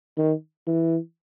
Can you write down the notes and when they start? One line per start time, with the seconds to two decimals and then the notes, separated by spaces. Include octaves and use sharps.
0.18 D#3
0.67 E3